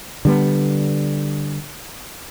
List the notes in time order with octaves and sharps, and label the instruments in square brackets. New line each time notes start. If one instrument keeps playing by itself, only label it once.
[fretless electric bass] D3 G3 B3